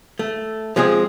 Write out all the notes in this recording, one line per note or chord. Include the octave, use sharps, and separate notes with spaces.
A3
F3 G#3 C4 G#4